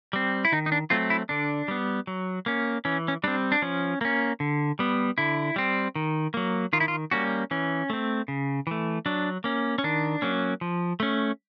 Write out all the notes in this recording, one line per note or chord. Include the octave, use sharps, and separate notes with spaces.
G3 C4
E4
D#3 D#4
D#4
D4
F#3 A3 C4 F4
E4
D3 D4
G3 B3
F#3
A#3 C#4
E3 C#4
C#4
G3 C4 D4
D4
F3 C#4
A#3 C#4
D3
G3 B3
D3 E4
G3 C4
D#3
F#3 A#3
D#3 F4
E4
F4
G3 A#3 C#4 F#4
E3 C#4
A3 C4
C#3
E3 A3
F#3 D4
A#3 C#4
C#4
D#3 D4
F#3 A#3 C#4
F3
A3 C#4